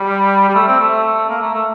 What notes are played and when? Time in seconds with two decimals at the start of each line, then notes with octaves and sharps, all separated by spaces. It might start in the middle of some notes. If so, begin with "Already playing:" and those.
Already playing: G3
0.49 G3
0.55 A3
0.67 C4
0.80 A3
1.29 A#3
1.42 A3
1.54 A3